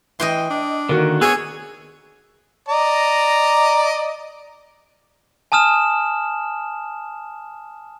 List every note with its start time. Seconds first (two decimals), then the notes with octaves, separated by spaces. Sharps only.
0.20 E3 D#5 G5 C6
0.50 D4
0.89 D3 D#3 A#3 F#4
1.21 B3 G#4 C#5 E6
2.69 D5 D#5 A#5
5.52 G#5 A5 D#6 F6 E7